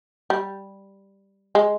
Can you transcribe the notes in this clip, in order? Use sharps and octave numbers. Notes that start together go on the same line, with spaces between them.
G3
G#3